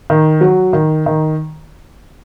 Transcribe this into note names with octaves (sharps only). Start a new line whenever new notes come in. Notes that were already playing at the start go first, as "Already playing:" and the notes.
D#3
F#3
D#3
D#3